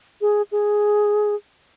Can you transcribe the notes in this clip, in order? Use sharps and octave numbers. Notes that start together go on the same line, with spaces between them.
G#4
G#4